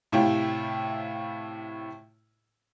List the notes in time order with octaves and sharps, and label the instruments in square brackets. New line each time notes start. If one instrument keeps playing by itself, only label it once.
[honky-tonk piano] A2 C3 E4 F4 C#5 G5